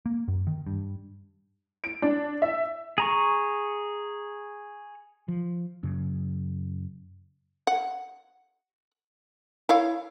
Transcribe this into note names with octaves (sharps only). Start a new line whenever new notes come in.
A#3
F#2
D#3
G2
D7
D4
E5
G#4 A#5 C#6
F3
F#2 C#3
F#5
E4 C#5 F5